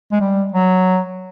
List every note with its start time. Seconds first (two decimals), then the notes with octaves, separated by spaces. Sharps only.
0.12 G#3
0.21 G3
0.53 F#3